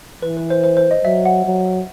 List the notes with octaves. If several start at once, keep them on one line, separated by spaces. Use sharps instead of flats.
E3 B4
B4
C5
C5
C5
D#5
F#3 E5
F#5
F#3